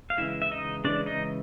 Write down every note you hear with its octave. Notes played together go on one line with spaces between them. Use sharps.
F5
C#3 E3 G#3 E4 E5
E5
D#4 D#5
C#3 E3 G#3 D4 D5
D#4 D#5